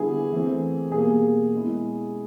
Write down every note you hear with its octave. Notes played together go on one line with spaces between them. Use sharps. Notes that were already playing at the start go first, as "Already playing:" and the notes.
Already playing: D3 G3 B3 E4 G#4
E3 A3 C4
B2 G3 A#3 G#4
B2 G#3 C#4 E4